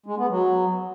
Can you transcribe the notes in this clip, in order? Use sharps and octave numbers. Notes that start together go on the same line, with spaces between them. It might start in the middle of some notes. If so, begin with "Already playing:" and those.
G#3
B3
F#3